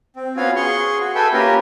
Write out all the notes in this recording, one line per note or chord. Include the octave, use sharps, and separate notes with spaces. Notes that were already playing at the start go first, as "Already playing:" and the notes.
C4
B3 C#4 F4 F#4 F5 G#5
G#4 C6 C#6
F#4
A4 B4 E5 G5 G#5
A#3 C#4 F4 G4 A#4 B4